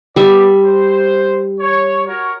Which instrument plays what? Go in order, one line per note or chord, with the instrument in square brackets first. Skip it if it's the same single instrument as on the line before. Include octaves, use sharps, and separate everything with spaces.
[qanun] G3 E5 [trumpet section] B3 D5
[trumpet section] C5
C#5
F#4 A#4 C#5